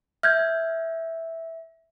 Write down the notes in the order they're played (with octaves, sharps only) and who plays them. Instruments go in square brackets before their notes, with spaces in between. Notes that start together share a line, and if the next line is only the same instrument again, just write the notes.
[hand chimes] E5 [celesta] F6 G6 G#6